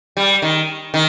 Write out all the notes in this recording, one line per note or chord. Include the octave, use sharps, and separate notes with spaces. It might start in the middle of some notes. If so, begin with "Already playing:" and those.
G3
D#3
D#3